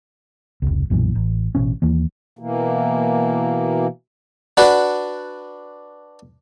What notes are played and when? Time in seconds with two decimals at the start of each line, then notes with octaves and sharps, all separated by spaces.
0.62 F1 C#2
0.90 B1 F#2 A#2 E3
1.15 A1
1.55 A1 B2 C#4
1.82 D#2 E3 A#3
2.39 B2 E3 A#3
4.57 D4 F#4 B4 D5 F#5